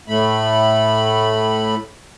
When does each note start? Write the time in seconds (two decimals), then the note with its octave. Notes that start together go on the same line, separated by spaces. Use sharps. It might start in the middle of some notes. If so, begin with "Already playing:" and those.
0.08 A2 A3 B5